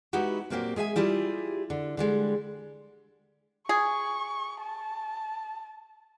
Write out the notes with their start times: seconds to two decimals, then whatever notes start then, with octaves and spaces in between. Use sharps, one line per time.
0.13 G#3 B3 D#4 E4 F#4 G4
0.50 A#2 F#3 A#3 C4 G4
0.76 G#3 G#4 E5 G5 G#5
0.96 G3 E4 F4 G4 G#4
1.70 D3
1.97 D3 G3 G#3
3.69 G#4 C#6
4.61 A5